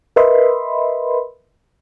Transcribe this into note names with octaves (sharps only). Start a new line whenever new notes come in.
A#4 B4 D#5 E5 B5 C6